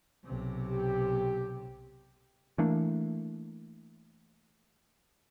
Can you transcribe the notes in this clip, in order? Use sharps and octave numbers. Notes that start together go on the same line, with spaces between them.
B1 C3
G4
E3 A3 A#3 D4